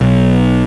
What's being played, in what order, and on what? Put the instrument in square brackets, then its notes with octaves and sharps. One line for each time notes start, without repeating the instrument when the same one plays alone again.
[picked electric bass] B1